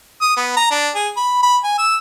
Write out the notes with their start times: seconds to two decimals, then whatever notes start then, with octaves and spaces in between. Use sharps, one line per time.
0.21 D#6
0.37 B3
0.57 A#5
0.71 D4
0.95 G#4
1.17 B5
1.43 B5
1.64 G#5
1.78 E6